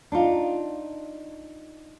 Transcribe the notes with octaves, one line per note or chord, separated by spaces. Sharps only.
D4 D#4 F4